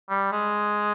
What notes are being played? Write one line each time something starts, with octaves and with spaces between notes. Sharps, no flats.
G3
G#3